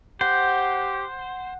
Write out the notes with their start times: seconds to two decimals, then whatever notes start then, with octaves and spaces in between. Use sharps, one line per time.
0.21 G4 C5 F#5